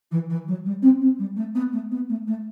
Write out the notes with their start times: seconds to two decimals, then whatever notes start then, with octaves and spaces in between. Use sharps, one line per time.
0.11 E3
0.29 E3
0.47 F#3
0.65 G3
0.82 C4
1.01 C4
1.18 G3
1.36 A3
1.55 B3
1.72 A3
1.91 B3
2.09 A3
2.27 A3